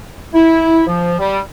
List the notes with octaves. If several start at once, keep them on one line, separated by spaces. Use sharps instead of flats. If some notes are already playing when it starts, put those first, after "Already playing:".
E4
F3
G3